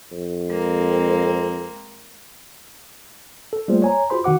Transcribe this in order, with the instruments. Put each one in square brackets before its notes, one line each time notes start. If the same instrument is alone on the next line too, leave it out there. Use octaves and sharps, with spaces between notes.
[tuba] F2
[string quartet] G#3 A#3 C4
[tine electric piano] A4
G3 A3 A#3 F4 G#4 C5
C#5 G#5 A#5
F4 F#4 G#4 C5 B5 C6
D#3 F#4 F#5 D6